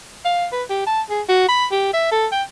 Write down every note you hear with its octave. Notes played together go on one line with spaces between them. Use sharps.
F5
B4
G4
A5
G#4
F#4
B5
G4
E5
A4
G5